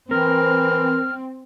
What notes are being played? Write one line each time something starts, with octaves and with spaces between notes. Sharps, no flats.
E3 C4 A#4 F6